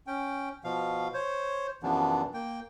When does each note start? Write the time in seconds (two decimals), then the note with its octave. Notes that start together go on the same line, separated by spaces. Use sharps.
0.07 C#4 G5
0.64 B2 F3 F5
1.14 C5 C#5
1.83 F#2 C3 E3 F3 B3 D4
2.34 A#3 G5